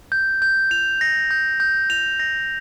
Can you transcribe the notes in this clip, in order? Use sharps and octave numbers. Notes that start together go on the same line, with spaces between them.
G6
G6
F7
A#6
G6
G6
F7
A#6